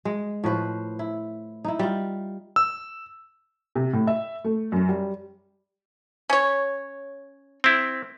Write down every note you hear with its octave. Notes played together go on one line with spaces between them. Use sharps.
G#3
A2 F3 B4 C5
E4
D#4 E4
G3 F4
E6
C3
A2
E5
A3
F#2
G3
C#4 C#5
C4 E4